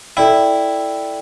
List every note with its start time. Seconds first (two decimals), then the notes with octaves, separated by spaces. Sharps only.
0.17 E4 A4 D5 G5